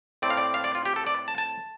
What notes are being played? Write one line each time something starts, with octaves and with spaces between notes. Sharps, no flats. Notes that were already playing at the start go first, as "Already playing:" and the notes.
A2 A3 C4 D5
F5
D5
F5
D5
F4
G4
A4
D5
A5
A5